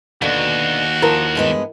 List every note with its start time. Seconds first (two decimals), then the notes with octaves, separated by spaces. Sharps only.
0.22 D#2 B2 D3 F#4 F5
1.02 F3 E4 A#4
1.35 G2 G#3 B3